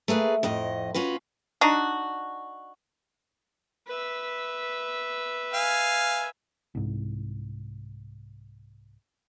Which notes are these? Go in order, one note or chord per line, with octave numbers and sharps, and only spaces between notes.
A3 A#3 G#4 B4
F2 A2 F3 D#5
C#4 F4 F#4 B4
D4 D#4 F#4
B4 E5
F5 G#5
C2 G#2